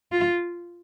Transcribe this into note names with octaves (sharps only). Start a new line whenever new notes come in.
F4